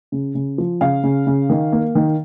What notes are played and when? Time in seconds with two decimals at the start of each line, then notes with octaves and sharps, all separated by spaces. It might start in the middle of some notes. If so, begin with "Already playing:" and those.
0.12 C#3
0.35 C#3
0.58 F3
0.81 C#3 F5
1.04 C#3
1.27 C#3
1.50 D#3
1.72 A#3
1.95 D#3